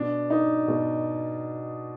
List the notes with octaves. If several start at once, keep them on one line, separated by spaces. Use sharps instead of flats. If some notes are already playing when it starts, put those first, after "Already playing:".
Already playing: B2 D4
D#4
B2